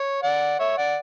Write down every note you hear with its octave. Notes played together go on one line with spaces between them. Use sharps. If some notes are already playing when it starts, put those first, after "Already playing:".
Already playing: C#5
D5 F#5
C#5 E5
D5 F#5